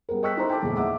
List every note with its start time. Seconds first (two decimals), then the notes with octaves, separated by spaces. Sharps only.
0.09 G3 B3 G#4 A#4
0.23 D#5 G5 C#6 E6 F#6 B6
0.37 D#4 E4 A4 C5 A#5 C6
0.50 G5 A5 D6
0.62 E2 A#2 E3 G#3
0.77 D#5 E5 F#5 D6 E6